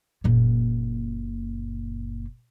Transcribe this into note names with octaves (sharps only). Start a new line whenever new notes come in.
F#1 A#2